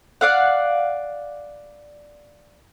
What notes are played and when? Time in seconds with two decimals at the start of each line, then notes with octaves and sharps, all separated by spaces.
0.21 D5 F5 F#5